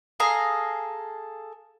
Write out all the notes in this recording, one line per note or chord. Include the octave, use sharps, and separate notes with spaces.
G#4 A4 F5 A#5